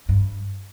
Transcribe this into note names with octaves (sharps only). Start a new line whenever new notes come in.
G2